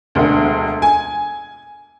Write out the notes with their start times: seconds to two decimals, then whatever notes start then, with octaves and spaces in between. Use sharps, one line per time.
0.15 E1 D2
0.82 G#5